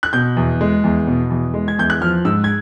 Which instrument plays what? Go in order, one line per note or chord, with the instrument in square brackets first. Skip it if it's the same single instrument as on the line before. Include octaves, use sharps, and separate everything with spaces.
[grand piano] F#6
B2 G6
E2
G#3
E2
B2
E2
G#3
G#6
E2 G6
F#6
F3 F6
G#2 E6
G#6